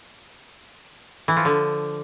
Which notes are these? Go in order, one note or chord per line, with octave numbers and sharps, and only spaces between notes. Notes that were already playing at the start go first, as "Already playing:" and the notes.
E3
F3
D3